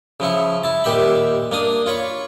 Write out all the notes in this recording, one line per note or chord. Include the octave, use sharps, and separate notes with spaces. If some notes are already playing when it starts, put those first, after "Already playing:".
C#3 F3 E4 C#6
E4 A5
D#2 A#2 G4 E5 B5
A#3 D4 D#6
F4 C#5 B5 C#6